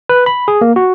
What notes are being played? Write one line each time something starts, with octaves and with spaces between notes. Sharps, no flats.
B4
B5
G#4
A#3
F#4